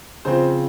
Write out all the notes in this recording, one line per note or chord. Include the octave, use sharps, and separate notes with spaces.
C#3 F3 C4 C5